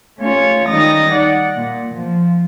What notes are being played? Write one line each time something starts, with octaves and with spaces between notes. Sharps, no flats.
A3 C#4 F4 C#5
D#3 G3 D#4 D#6 A6 A#6
D5 F#5
A#2
F3